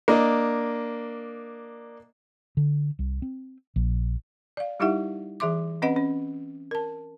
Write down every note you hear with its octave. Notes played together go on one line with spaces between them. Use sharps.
A#3 D4 D#5
D3
C2
C4
A#1
D5 F5
G3 D#4 E4 G4 E5 F#5
E3 G#4 E5 C6 D6
C4 C#4 B4 D#5 F#5
C#4
A#4 A5